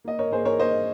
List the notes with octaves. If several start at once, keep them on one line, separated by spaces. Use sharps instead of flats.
A#3 D#5
A#4 C#5
A#3 G#4 C5
A#4 C#5
A#3 C5 D#5